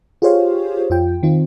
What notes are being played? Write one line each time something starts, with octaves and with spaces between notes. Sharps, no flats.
F4 G4 G#4 C5 C#5 F5
F2 F4 G5
D#3 C4 D#4 F4